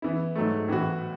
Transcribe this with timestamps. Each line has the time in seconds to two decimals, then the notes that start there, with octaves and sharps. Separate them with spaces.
0.02 E3 B3 E4
0.36 G#2 F#3 A3
0.68 A2 E3 B3 F#4